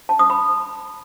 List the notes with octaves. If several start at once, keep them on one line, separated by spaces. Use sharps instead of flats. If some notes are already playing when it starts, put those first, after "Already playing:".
A5
D#6
B5